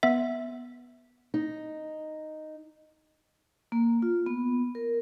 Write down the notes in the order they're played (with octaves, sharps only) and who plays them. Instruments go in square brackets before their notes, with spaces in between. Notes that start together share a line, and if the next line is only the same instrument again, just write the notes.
[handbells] B3 E5
[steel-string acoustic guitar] D#4
[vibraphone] A#3
F4
B3
A#4